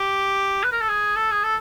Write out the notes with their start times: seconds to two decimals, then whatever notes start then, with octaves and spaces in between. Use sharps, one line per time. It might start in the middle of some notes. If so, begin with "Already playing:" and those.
Already playing: G4
0.64 B4
0.72 A#4
0.81 A4
0.89 G#4
1.16 A4
1.32 G#4
1.44 A4